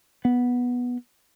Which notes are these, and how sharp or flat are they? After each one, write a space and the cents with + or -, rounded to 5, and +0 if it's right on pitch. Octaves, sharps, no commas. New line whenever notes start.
B3 -10